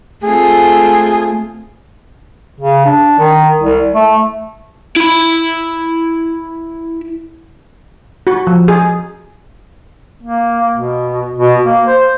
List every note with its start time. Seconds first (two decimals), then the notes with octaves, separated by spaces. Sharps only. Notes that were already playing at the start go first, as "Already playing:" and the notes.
0.23 A3 C4 F4 G#4
2.60 C#3
2.86 D4
3.19 D#3
3.61 C2
3.94 A3
4.96 E4 B5
8.27 F#4
8.47 F3
8.68 G#4
10.23 A#3
10.75 B2
11.38 B2
11.64 A#3
11.87 C5